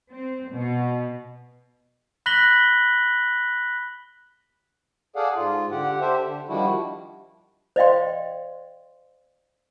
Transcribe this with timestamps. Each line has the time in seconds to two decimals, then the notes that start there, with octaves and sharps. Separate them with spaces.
0.10 C4
0.52 B2
2.26 B5 F#6 A#6 B6 F#7 G7
5.16 G#4 A4 D5 F5 F#5
5.35 G#2 F4
5.71 D3 G4 F#5
6.01 G4 A4 C5 E5
6.23 D3
6.49 D#3 F3 G3 D4 E4 F#4
7.76 C5 D5 D#5 F5 G5 C6